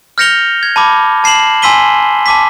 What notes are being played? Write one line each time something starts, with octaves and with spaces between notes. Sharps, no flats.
F6 G6 A#6 C#7 F7 G7
G#6
A5 B5 D6
A5 C7 E7 F#7
G#5 C6 E6 B6 D#7 G7
A5 D6 B6